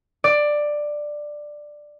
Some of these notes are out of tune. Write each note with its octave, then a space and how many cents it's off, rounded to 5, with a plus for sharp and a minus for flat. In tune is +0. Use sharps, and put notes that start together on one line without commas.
D5 +10